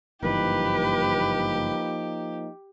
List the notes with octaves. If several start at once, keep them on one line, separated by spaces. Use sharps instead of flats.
F#1 G2 E3 F3 A#3 D#4 G4 B4